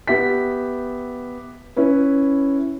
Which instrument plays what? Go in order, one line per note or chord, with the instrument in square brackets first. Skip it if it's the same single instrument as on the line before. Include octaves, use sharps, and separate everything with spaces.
[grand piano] B3 G4 E5 B6
C#4 E4 B4